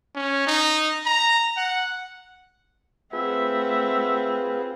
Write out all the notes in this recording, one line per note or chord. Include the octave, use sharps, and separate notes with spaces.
C#4
D#4
A#5
F#5
A3 C4 F4 G#4 B4 E5 F#5